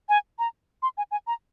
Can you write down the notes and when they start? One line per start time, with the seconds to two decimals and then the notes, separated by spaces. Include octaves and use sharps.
0.09 G#5
0.39 A#5
0.83 C6
0.98 G#5
1.11 G#5
1.27 A#5